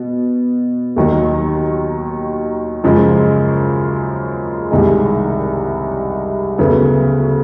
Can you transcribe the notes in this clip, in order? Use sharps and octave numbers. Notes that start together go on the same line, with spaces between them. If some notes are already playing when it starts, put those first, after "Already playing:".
Already playing: B2
D#2 D#3 F#3
F#2 C#3 F3 G#3
C2 C3 D#3 G#3
D2 C#3 F#3 B3